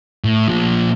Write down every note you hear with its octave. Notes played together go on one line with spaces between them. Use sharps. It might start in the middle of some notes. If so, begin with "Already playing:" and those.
A2
A#2 F3